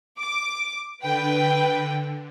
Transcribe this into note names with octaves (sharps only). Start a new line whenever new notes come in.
D6
D3 B4 G5